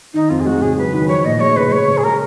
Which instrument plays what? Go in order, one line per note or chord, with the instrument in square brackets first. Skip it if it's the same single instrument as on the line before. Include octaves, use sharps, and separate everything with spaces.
[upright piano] D#3 [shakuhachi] D#4
[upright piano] F2 [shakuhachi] F4
[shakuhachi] G#4
[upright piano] G#3 [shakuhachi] F#4
[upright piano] C#3 [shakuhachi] G#4
[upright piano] F#3 [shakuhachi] B4
[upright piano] D#3
[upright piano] F3 [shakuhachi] C#5
[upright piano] A#2 [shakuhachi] D#5
[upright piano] G#3 [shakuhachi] C#5
[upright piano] C#3 [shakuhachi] B4
[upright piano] G#3 [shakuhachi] C#5
[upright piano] C#3
[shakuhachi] G#4
[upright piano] G#3 [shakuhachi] A#4